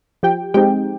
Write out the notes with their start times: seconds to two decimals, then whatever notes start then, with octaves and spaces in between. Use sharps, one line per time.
0.23 F3 G4 G5
0.54 G#3 C4 D#4 G4 G5